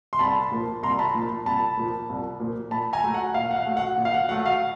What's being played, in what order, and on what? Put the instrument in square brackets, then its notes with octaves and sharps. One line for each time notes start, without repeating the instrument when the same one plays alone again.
[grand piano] C6
C2 A5 B5
A#2 F3 A#3
C2 A#5 C6
A5 B5
A#2 F3 A#3
C2 A5 B5
A#2 F3 A#3
C2
A#2 F3 A#3
A#2 A5 B5
G#5 A#5
F#3 A3
F#5
A#2 F5
F#5
F5
F#3 A3
F#5
A#2
F5
F#5
F#3 A3 F#5
F5